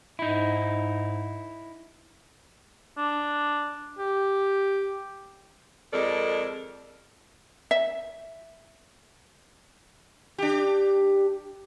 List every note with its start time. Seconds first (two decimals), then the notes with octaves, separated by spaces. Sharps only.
0.19 G#2 D#4 E4
2.97 D4
3.99 G4
5.93 F2 G#3 A4 A#4 D5
7.71 E5
10.38 D4 G4